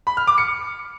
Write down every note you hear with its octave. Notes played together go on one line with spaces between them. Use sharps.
B5
F6
D6
C#7